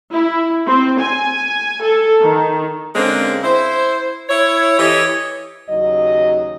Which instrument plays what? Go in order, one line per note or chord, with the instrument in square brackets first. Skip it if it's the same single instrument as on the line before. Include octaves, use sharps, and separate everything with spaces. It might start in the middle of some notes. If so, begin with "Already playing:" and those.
[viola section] E4
C4
G#5
A4
D#3
[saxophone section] D3 G#3 A#3 C4 C#4
E4 C5
E4 C#5
E3 G4 A4 C#5 D#5
[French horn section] D#2 C#3 F#3 D#4 D#5